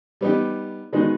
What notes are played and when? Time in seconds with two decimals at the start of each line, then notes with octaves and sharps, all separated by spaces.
0.21 G3 B3 D#4 G4
0.92 D#3 G#3 B3 D#4 F#4